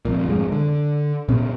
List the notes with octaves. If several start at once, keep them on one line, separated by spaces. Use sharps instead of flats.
F1 F2 A#2
G#1 F2 D#3 G#3
D3
A#2 B3 C#4